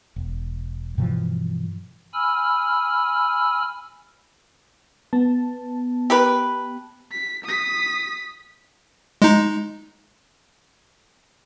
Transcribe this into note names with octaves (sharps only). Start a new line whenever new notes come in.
E1
G2 B2 E3 F3
G#5 B5 E6 F6
B3 A5
G4 A#4 B4
B6
D#6 B6
G#3 D#4